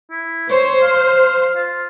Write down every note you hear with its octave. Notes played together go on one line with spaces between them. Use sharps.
E4
C5 C#5
F5
F4